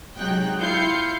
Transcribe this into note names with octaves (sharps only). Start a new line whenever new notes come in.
C3 F#3 G#3 D#4 G5 F#6
E4 F4 F5 G6 C7 C#7